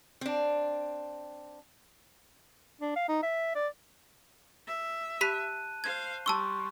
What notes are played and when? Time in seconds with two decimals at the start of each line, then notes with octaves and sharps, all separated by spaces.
0.21 C4 D4
2.81 D4
2.96 F5
3.09 D#4
3.23 E5
3.55 D5
4.67 E5
5.21 G4 A5 B5 F#6 B6 D#7
5.84 C5 F5 G#6
6.26 G3 A5 C6 C#6 E6 G7